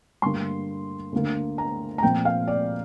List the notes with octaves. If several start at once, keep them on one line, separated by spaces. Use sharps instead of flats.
G2 D3 A#3 C6
D2 D3 A#3
A#5
A#5
A#2 F3 C4 G5
F5
D5